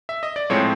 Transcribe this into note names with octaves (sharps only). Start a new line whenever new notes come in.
E5
D#5
D5
A2 F3 G#3 C4 C#5